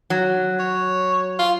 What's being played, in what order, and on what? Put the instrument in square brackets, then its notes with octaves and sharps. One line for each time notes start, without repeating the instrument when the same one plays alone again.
[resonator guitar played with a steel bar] F#3
[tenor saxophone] C#5
F4